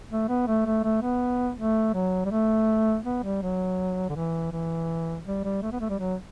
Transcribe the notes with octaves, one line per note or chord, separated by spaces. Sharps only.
A3
B3
A3
A3
A3
B3
A3
F#3
G3
A3
B3
G3
F#3
D3
E3
E3
G3
G3
A3
B3
A3
G3
F#3